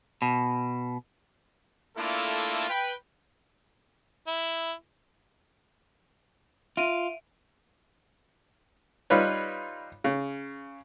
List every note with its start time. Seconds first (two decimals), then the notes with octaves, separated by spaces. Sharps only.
0.22 B2
1.97 A3 A#3 D4 E4 F4 A4
2.69 B4 G5
4.27 E4
6.77 F4 E5 D7 D#7
9.10 G3 D#4 F4 B4 C#5
10.04 C#3